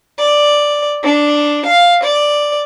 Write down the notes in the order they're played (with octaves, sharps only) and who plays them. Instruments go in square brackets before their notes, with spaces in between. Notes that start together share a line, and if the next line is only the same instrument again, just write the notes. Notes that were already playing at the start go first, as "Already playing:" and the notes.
[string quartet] D5
D4
F5
D5